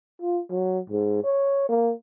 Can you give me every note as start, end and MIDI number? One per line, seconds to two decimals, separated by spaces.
0.21 0.40 65
0.51 0.79 54
0.90 1.19 44
1.24 1.68 73
1.69 1.93 58